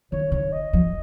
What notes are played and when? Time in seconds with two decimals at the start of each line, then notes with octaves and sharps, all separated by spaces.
0.12 D#3 C#5
0.32 D#3 C#5
0.52 D#5
0.73 F3